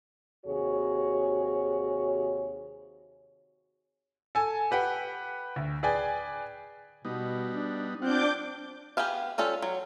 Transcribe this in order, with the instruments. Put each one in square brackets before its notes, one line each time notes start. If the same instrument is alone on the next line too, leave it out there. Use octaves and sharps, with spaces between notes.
[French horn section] D#2 C3 F#4 G#4 C#5
[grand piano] A4 G#5
G4 B4 F#5 G5
D2
G#4 B4 D5 G5 G#5
[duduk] B2 [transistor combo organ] G3 B3 D#4
[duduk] D4
[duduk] C4 [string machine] D4 D6 G6 [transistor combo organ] F4 F#5
[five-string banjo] B3 G4 G#4 E5 F5
G3 C#4 F4 A4
F#3